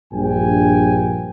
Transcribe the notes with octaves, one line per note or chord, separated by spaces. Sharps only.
A#1 G2 G5 G#5